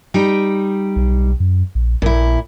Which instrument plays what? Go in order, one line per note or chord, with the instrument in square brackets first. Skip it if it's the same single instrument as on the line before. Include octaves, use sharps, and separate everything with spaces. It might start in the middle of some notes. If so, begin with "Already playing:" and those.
[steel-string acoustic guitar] G3 D#4 G5
[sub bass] B1
F#2
A#1
[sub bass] A#1 [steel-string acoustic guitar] A#2 E4